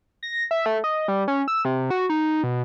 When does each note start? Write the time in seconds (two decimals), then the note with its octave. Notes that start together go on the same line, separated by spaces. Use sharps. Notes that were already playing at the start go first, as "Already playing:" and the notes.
0.23 A#6
0.51 E5
0.66 A3
0.84 D#5
1.08 G3
1.28 C#4
1.48 E6
1.65 C3
1.90 F#4
2.10 D#4
2.44 B2